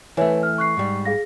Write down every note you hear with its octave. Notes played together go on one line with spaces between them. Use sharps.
E3 A3 B4 C#5 G#5
F6
C#6 F#6 C7
G#2 G3
G#4 F5 A#6